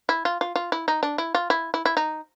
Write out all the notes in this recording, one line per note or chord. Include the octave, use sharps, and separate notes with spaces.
E4
F4
F4
F4
E4
D#4
D4
E4
F4
E4
E4
E4
D#4